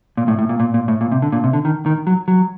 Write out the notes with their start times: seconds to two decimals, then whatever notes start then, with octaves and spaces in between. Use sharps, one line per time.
0.17 A#2
0.28 A2
0.39 A2
0.49 A#2
0.60 A#2
0.74 A#2
0.88 A2
1.01 A#2
1.12 C3
1.22 D3
1.32 A#2
1.44 C3
1.53 D3
1.65 D#3
1.86 D#3
2.07 F#3
2.28 F#3